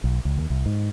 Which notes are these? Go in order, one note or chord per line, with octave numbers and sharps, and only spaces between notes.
B1
C#2
D#2
C2
G#2